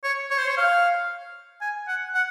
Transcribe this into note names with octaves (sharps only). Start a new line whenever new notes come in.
C#5
C#5
C5
C#5
F5
G#5
F#5
F#5